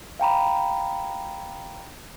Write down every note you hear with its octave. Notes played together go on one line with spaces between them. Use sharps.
F5 G5 A#5 B5